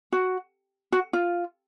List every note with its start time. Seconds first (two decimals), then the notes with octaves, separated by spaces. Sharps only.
0.12 F#4
0.92 F#4
1.13 F4